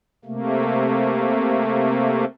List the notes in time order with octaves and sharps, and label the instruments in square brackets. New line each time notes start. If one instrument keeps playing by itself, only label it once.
[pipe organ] C3 A3 A#3